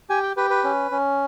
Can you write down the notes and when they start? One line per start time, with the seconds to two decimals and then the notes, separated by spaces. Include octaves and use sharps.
0.10 G4 G#5
0.23 G5
0.37 G4 B4
0.50 B4
0.64 C#4
0.91 C#4